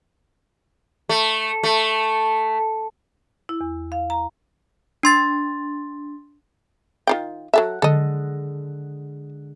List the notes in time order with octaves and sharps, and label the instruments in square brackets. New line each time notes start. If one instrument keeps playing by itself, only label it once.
[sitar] A3
A3
[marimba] E4
E2
F5
A#5
[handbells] D4 C6 A6
[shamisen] D#3 F4 G5
[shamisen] F#3 A4 E5 [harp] F#5
[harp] D3 G#3 [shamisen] A4 D#5